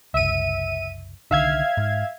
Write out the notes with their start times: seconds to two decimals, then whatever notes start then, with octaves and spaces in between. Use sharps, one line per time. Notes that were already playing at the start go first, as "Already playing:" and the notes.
0.14 F#1 C2 E5 D#7
1.31 C2 D3 D#3 E5 F5 G#6
1.77 G#2